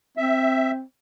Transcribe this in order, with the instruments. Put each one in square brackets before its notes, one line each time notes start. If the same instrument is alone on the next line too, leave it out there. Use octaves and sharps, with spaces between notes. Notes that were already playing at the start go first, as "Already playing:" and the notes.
[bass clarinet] C4 [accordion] E5